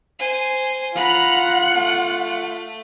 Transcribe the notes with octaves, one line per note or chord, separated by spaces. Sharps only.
C5 G#5
F4 F#5 A#5 B5
A3